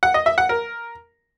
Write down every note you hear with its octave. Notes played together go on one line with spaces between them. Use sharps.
F#5
D#5
E5
F#5
A#4